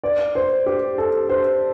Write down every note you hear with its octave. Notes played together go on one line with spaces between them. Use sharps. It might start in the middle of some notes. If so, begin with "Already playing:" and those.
D5
C5
G4
A4
C5